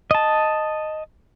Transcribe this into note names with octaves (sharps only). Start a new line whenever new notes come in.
D#5 A5